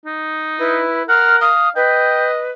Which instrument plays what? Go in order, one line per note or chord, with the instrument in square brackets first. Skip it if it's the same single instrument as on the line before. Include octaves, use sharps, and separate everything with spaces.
[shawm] D#4
[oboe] E4 [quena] B4
[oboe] A#4 [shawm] F#5 [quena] F6
[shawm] F5 [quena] D#6
[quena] B4 [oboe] D#5 [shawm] G5